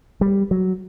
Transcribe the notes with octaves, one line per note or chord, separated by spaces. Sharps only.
G3
F#3